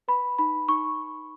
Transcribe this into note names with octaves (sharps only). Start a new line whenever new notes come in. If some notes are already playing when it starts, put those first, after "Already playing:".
B4 B5
D#4 B5
D#4 C#6